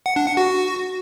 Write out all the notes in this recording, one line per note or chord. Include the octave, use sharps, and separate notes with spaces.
F#5
D4
F#5
F#4